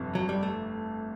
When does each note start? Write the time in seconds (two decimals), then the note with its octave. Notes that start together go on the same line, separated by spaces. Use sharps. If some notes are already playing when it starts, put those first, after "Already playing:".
Already playing: G1 F2 C3
0.15 F#3
0.29 G3
0.43 A3